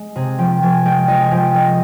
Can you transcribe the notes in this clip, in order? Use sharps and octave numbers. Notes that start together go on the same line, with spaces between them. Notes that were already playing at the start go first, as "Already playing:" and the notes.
Already playing: G#3
C3 G#4
F3 G5
F3 G#5
G#3 G5
F3 D#5
G#5
F3 G5
G#3 D#5